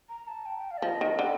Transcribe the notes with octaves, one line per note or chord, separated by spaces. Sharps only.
A#5
A5
G5
G5
F5
D5
F3 D#5
D#3
D3 G5